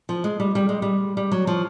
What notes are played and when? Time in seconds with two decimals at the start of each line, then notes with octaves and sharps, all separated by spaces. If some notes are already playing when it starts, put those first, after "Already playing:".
0.09 F3
0.24 G#3
0.40 G3
0.55 G3
0.69 G#3
0.82 G3
1.17 G3
1.32 F#3
1.47 F3